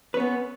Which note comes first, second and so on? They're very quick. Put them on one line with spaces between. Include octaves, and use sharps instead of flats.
B4 C#4 B3